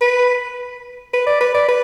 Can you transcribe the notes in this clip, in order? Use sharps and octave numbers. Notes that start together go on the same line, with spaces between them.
B4
B4
D5
B4
D5
B4